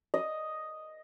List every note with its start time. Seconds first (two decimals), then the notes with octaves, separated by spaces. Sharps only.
0.14 D#5